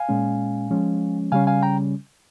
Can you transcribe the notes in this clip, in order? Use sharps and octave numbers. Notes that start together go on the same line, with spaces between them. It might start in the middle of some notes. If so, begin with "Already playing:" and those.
Already playing: F5 G#5
A#2 G#3 C#4
F3 G#3 C#4
C#3 G3 C#4 F5 G#5
F5 G#5
G5 A#5